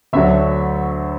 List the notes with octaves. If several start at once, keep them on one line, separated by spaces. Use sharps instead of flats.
D2 D3 F#3 E5